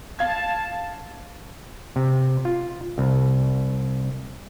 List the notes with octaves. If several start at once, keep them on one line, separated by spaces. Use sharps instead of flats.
F5 A5 G#6
C3
F4
C2